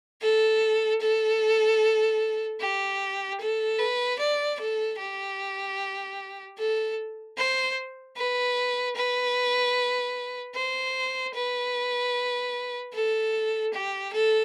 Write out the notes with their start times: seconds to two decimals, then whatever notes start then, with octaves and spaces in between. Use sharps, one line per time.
0.21 A4
1.01 A4
2.60 G4
3.40 A4
3.79 B4
4.19 D5
4.59 A4
4.99 G4
6.58 A4
7.37 C5
8.16 B4
8.96 B4
10.55 C5
11.34 B4
12.93 A4
13.73 G4
14.13 A4